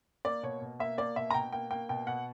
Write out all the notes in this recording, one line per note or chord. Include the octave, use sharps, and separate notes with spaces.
A#3 D5
B2 C#5
B2
A#3 E5
A#3 D5
B2 E5
A#5
B2 G5
A#3 G5
A#3 G5
B2 G5
B2 F#5